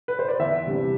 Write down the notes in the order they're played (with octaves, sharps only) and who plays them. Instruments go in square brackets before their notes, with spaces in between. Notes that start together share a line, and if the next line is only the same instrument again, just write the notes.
[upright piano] B4
C5
D5
E2 E5
C3 G3 D4